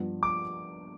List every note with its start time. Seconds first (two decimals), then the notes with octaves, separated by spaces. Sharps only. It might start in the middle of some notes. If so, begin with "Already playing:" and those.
Already playing: G2 F3 B3 F4
0.23 D6